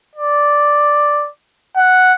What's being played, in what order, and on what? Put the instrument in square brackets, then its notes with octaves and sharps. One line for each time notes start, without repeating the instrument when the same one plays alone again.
[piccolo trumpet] D5
F#5